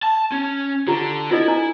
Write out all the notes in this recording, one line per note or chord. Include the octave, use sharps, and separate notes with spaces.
A5
C#4
D3 F4 G4 A#5
E4 F4 A4 D#5
D4 A4 A#5